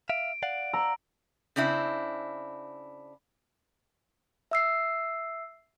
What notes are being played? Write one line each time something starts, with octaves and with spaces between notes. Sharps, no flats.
E5 F5 D7
D5 F5 F#5
A#5 E6
C#3 C4 D4 E4
E5 E6 C7